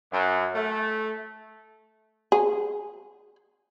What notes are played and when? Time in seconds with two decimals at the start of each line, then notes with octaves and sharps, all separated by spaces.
0.12 F#2
0.56 A3
2.32 G#4